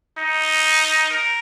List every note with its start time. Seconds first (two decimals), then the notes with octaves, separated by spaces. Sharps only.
0.18 D#4
1.10 A#4